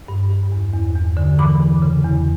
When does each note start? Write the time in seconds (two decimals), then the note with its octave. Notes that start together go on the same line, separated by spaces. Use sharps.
0.08 G2
0.30 G2
0.52 E2
0.73 E2
0.95 E2
1.17 D3
1.39 E3 B5 D6
1.61 E2
1.82 C#3
2.04 E2